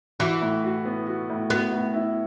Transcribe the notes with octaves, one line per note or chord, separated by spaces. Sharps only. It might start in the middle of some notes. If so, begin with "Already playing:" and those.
E3 F#4
A2
F#4
B3
F#4
A2
B3 F#4
A2
E4